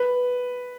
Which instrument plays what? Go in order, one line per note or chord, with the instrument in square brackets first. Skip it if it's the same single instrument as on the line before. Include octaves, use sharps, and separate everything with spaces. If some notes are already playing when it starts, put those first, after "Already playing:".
Already playing: [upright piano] B4